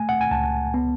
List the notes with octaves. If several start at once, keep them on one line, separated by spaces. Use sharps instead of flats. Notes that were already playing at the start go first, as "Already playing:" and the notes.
Already playing: A3 G#5
F#5
G#5
C#2 A5
B3